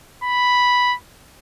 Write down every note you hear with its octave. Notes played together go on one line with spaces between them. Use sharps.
B5